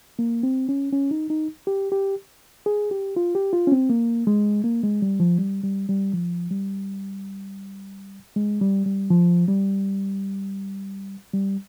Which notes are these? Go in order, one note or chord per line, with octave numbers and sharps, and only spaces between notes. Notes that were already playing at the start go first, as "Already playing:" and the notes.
A#3
C4
C#4
C#4
D#4
D#4
G4
G4
G#4
G4
F4
G4
F4
C#4
C4
A#3
G#3
A#3
G#3
G3
F3
G3
G3
G3
F3
G3
G#3
G3
G3
F3
G3
G3